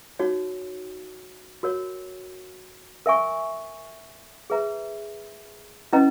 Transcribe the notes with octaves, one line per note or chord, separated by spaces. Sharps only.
D#4 F#4 C#5
F#4 A#4 C#5
A#4 E5 G#5 C#6
G#4 B4 E5 A#5
C#4 E4 B4 D#5 A#5